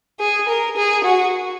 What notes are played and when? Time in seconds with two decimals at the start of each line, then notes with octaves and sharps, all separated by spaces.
0.20 G#4
0.49 A#4
0.77 G#4
1.04 F#4